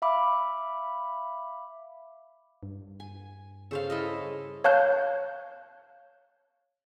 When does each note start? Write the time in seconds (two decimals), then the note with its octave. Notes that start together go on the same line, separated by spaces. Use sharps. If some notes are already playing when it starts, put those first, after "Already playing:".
0.02 E5 F5 B5 D6
2.63 G2
3.00 G#5
3.71 C#3 A4 C5 F5
3.90 E4 A4 D#5
4.64 C#5 F5 A5 F#6 G6